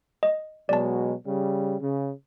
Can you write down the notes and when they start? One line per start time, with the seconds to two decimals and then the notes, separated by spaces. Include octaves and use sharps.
0.23 D#5
0.69 B2 F#3 G#3 D5 A5
1.25 C#3 G3
1.81 C#3